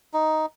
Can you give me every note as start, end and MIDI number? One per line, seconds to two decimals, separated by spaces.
0.13 0.46 63